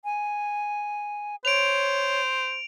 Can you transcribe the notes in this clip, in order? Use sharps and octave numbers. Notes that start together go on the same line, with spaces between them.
G#5
C5 C#5 D7 F7